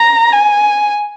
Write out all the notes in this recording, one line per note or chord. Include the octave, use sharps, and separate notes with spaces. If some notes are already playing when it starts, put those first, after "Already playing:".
Already playing: A#5
G#5